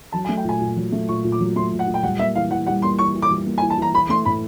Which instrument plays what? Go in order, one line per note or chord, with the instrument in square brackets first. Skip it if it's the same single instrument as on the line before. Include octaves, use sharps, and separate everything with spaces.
[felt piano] F#3 [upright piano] A5
[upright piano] G#5
[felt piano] A3
[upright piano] G5
[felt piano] A#2 [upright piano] G#5
[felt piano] A#2
F#3
A3
[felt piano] A#2 [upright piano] C#6
[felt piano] A#2
[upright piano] D6
[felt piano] F#3
[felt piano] A3 [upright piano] C6
[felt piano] A#2
[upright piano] F#5
[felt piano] A#2
[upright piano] G5
[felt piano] G3 [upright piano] F#5
[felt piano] A#3 [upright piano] E5
[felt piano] E3 [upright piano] F5
[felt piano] E3 [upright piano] F#5
[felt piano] G3 [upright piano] F#5
[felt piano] A#3 [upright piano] C6
[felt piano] E3 [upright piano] C#6
[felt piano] E3
[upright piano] D6
[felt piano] G3
A#3
[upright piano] G#5
[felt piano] E3
[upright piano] A5
[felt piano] E3 [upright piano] A#5
[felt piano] E3 [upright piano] B5
[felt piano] A3 [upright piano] C6
[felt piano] A2 [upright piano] B5